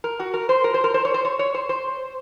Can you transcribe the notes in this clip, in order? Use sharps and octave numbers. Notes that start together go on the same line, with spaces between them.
A#4
F#4
A#4
C5
A#4
C5
A#4
C5
C#5
C5
C#5
C#5
C5
C5